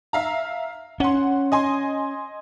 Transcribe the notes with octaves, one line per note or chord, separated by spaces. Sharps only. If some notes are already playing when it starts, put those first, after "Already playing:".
E5 F5 A#5
C#4 F#5 C6
D#5 G#5 C6